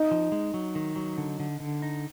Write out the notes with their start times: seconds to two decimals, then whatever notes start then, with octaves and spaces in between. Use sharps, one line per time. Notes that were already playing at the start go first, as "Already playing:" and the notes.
Already playing: D#4
0.11 F3
0.32 G#3
0.54 F#3
0.75 D#3
0.96 F#3
1.18 D3
1.40 D3
1.60 D3
1.82 D#4